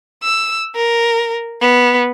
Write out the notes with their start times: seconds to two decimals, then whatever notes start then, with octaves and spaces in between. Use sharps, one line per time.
0.23 E6
0.76 A#4
1.61 B3